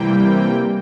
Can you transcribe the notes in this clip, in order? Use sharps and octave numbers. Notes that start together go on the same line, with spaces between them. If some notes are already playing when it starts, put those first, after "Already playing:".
Already playing: C3 E3 G3 A#3 G5